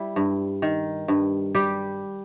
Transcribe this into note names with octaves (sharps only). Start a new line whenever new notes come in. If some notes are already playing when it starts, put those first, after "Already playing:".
Already playing: G3 E4
G2
D#3
G2
G3 G4